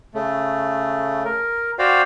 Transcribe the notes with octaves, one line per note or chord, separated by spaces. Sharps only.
C#3 A3
A#4
F#4 C5 D5 F5 G5